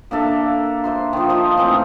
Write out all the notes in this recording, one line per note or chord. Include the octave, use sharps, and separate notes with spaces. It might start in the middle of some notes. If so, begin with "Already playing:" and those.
A#3 D4 A4 E5
C5 E5 C6
D#3 F3
F4 C5 D#5
A2 E3 C4 D#4